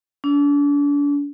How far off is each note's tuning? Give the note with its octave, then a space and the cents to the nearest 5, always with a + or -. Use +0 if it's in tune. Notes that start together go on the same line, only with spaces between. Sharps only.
D4 -35